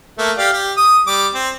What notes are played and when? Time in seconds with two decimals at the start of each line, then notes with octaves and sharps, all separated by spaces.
0.18 A3 A#3
0.38 G4 D5 F5
0.53 G4
0.77 D#6
1.07 G3 D6
1.34 C4